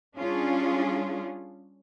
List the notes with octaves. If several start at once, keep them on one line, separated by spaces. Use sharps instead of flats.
G3 C#4 D4 F4 G#4